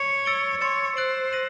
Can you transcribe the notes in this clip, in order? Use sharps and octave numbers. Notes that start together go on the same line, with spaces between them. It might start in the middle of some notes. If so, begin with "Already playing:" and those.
Already playing: C#5
E6 A6 D7 G7
C#5 C6 E6 A6 C#7 E7
C5 F#6 A6 D7 F#7
F#6 A#6 D#7 F#7